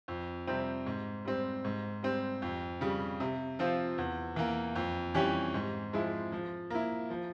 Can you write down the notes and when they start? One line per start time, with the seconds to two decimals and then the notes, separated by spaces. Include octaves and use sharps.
0.08 F2
0.47 C3 G3 C4
0.86 G#2
1.25 G3 C4
1.65 G#2
2.03 G3 C4
2.42 F2
2.81 C#3 G3
3.20 C3
3.59 F3 C4 F4
3.98 E2
4.36 E3 A#3
4.75 F2
5.14 E3 G3 C#4 G4
5.54 G#2
5.93 F3 G#3 E4
6.32 F3
6.70 A#3 E4
7.10 F3